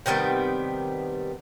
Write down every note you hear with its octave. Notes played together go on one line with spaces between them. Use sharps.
C3 D#3 G3 B3